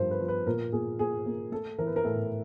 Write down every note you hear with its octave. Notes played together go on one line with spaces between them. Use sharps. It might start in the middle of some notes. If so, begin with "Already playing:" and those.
Already playing: G2 F3 A#4 C5
B4
F3
B4
A#2 A#4
A#2 G#4
A#2 G#4
A#3
A3 A4
E3 A#4
B4
A#4
A2 A4